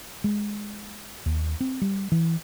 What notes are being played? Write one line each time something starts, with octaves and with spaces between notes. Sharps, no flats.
G#3
D#2
C4
G3
E3